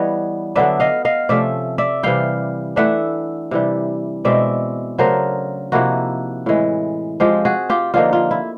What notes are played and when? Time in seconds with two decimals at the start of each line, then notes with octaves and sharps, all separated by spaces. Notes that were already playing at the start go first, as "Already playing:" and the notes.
Already playing: E3 G3 B3 C#5 D#5
0.55 D3 F#3 B3 D4 D5 E5
0.80 D#5 F5
1.05 D#5 F5
1.29 C3 F3 A3 C#4 D5 E5
1.78 D5 E5
2.03 C3 E3 G3 F5 G5
2.76 E3 A3 D4 E5 F#5
3.51 C3 E3 G3
4.25 B2 G#3 C4 D5 E5
4.98 C#3 F#3 A3 D4 A#4 C5
5.72 C3 F3 A#3 D#4 E4 F#4
6.46 A2 E3 G#3
7.20 F3 G#3 C4 F4 G4
7.45 F#4 G#4
7.70 F4 G4
7.94 D3 F3 A#3 D#4 F4
8.13 F4
8.31 E4